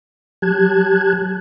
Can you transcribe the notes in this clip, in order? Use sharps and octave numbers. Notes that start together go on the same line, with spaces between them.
F#3 G4 A5 F#6 G#6